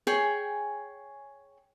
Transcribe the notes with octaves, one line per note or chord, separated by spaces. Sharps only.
G#4 C#5 G5 G#5